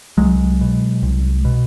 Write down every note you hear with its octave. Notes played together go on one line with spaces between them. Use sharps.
C2 F#3 G#3
B2
C2
B2